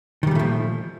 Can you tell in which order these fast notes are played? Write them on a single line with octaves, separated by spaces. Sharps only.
D#3 G3 A#2 A3 F3